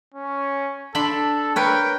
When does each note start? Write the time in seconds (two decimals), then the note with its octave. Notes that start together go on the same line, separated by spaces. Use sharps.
0.14 C#4
0.95 D4 A4 B5 C6
1.56 A#4 B4 C#5 G5